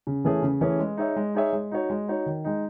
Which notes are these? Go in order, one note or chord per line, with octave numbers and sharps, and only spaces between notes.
C#3
E3 A3 C#4 G#4
C#3
E3 A3 C#4 G#4
G#3
D#4 G#4 C#5 E5
G#3
D#4 G#4 C#5 E5
G#3
D#4 F#4 C#5
G#3
D#4 F#4 C#5
D#3
G#3 D#4